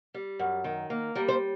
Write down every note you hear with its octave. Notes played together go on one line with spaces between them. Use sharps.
G3
F#2
D#3
A#3
G3 A#4
C5